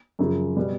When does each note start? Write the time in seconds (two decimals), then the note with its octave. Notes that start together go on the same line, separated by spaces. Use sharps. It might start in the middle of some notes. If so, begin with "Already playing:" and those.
0.19 F#2 C#3 F3
0.56 B2 G3 B3